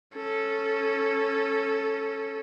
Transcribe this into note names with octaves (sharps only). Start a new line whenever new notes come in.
C#4 A4